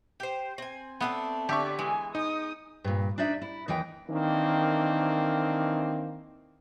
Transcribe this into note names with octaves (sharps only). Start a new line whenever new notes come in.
G4 C5
C4 G#5
A3 B3 C4 D4
D3 G4 D5 E5 C#6
E3 G#3 G#5
D#4 D#6
G2 A#2
D4 D#4 D5 E5
E4
D#2 E3 D#5 G5
D#3 E3 A#3 C4 D4